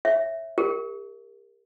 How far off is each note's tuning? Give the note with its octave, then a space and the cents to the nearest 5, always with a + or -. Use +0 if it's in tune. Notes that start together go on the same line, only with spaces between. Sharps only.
C#5 -15 E5 +0
G4 +40 A#4 +0